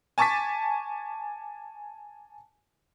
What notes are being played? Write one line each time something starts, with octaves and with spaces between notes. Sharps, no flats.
G#5 A5 C#6 D6 A6 B6